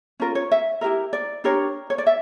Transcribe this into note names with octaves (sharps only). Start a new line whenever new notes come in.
C#4 F4 A#4
C#5
E5
E4 G4 A#4 E5
D5
D4 G4 A#4 C#5
C#5
D5
E5